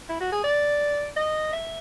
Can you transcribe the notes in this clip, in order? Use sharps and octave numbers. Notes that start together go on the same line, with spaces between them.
E4
F#4
G#4
D5
D#5
E5